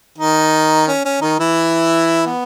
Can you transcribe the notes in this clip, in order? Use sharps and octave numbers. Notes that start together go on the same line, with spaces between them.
D#3 D#4
C#4
C#4
D#3 D#4
E3 E4
B3